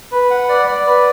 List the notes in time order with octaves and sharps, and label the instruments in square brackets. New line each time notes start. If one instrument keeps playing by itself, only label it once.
[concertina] B4
F#5
D5
D5
B4